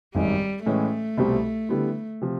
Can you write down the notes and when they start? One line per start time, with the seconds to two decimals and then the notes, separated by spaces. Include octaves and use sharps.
0.15 G#1 F#2 D#3 G3 G#3
0.66 A2 E3 G#3 A3 C#4
1.18 C2 B2 G3 C4
1.69 D3 G3 B3 E4
2.21 C3 F3